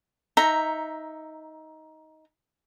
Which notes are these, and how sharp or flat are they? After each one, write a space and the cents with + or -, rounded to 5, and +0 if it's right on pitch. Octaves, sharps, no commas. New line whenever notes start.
D#4 +15 E5 +0 A#5 +0